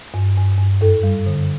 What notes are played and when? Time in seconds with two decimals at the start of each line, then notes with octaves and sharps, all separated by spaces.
0.14 G2
0.37 G2
0.58 G2
0.81 F#2 A4
1.03 G3
1.26 D3